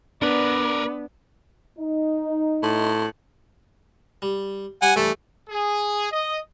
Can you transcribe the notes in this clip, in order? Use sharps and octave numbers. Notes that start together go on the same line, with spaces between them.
B3 D4 A#4 B4 D5
D#4
A2
G3
G3 F#5 G#5
G2 E3 A3 A5
G#4
D#5